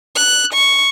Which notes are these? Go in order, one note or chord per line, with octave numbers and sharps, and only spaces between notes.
F#6
C#6